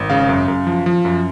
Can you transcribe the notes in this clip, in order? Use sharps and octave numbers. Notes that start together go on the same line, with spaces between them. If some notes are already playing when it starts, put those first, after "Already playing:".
Already playing: G#1
C#3 F5
F#2
F#2
F3
F3
F#2